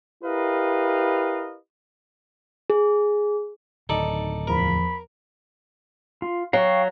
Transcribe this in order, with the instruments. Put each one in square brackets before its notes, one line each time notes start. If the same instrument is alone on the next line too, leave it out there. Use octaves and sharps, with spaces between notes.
[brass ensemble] E4 G4 A#4 B4 D#5 F5
[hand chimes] G#4
[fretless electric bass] D1 D#3 [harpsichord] D#4 A4 D5
[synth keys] E2 F3 [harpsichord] A#4 [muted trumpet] B5
[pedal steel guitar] F4
[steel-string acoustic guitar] F#3 [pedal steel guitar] F5 G5 C#6